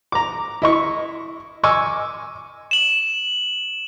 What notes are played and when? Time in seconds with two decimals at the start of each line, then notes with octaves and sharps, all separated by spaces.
0.12 A#5 D6
0.62 E4 D#5 C#6
1.63 D#5 G#5 C#6 D6 E6
2.71 E7 F#7